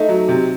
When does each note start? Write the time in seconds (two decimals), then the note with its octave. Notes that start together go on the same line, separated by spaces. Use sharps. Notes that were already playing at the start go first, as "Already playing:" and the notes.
Already playing: A3 D#4
0.09 F#3
0.28 C3